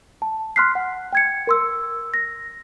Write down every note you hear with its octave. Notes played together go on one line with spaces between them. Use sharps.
A5
C6 F6 F#6 B6 C7
F#5
G5 G#6 C#7
A#4 C6 E6
A#6